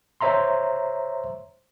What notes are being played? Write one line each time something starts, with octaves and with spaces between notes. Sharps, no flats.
C5 C#5 E5 A#5 C6